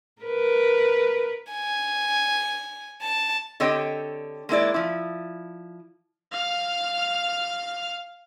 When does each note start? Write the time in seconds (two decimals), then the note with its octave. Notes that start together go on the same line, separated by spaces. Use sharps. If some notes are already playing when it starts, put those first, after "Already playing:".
0.22 A#4 B4
1.52 G#5
3.02 A5
3.60 D3 C4 G4 C#5 D#5 G5
4.49 G#3 A#3 E4 D5
4.74 F3 E4
6.32 F5 F6